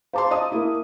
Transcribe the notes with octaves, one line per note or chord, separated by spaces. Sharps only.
C5 F5 A5 A#5 C6 D6
D#5 A5 D#6
A#3 E4